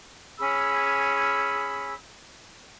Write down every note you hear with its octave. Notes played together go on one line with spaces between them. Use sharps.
C#4 G#4 B5 E6